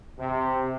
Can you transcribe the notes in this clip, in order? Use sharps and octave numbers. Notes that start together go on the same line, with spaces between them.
C3